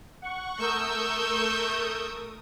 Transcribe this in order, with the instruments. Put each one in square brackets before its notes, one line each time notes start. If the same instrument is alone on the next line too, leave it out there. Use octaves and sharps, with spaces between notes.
[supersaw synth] F#5 C#6
[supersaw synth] A3 A#4 D#6 [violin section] C#6 E6 G6